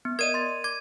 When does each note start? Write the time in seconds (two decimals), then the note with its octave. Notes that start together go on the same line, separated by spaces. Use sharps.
0.05 B3
0.19 A#4 D5 D#5 G#6 D#7
0.34 C6 A6
0.64 D6 G#6